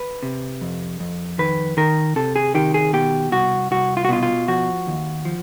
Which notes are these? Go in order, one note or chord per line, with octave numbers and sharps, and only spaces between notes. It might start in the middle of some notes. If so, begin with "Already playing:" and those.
Already playing: B4
C3
F2
F2
D#3 B4
D#3 A#4
C3 A4
G#4
D#3 G4
G#4
B2 G4
C2 F#4
C2 F#4
F4
F#4
B2 F4
F4
F3 F#4
D#2
F3